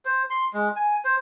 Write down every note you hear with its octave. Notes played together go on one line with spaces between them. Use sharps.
C5
C6
G#3
G#5
C5